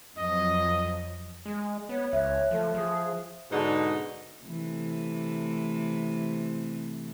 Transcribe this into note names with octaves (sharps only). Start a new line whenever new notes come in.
F2 F#3 D#5
G#3
B3 C#5
C#2 C#5 E5 F#6
F3 A3
F3 G#4
G#2 B2 D3 D#4
C3 E3 A3